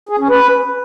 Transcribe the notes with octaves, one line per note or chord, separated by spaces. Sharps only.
G#4
C#4
B4